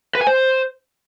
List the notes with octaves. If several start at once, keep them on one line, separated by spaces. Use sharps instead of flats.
B4
G#5
C5